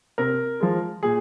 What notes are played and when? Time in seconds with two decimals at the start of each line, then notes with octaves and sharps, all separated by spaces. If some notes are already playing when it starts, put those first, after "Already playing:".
0.18 C3 A#4
0.60 F3 G#3
1.03 A#2 G#4